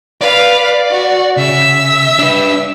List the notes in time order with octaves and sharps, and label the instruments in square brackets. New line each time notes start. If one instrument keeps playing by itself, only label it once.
[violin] B4 F5 [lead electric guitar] D5
[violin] F#4
[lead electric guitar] C#3 [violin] E5 E6
[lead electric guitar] D4 B4